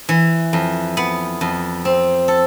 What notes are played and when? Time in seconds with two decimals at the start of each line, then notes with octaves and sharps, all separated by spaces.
0.09 E3
0.53 F2
0.97 B3
1.41 F2
1.85 C4
2.28 A4